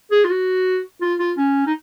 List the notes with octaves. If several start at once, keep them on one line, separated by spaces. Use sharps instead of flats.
G#4
F4
F#4
F4
F4
C#4
D#4